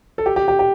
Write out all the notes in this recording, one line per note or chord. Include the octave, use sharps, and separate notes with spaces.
A4
G4
G4
G4
G4